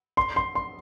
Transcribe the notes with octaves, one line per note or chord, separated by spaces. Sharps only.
C6
C6
C6